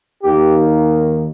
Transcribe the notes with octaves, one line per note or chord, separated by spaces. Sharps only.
D#2 D#3 A#3 G4